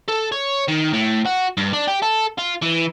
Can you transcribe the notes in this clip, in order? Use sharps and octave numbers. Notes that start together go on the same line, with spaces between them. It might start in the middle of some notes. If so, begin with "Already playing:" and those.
A4
C#5
D#3
A2
F#4
G2
D4
G4
A4
F4
E3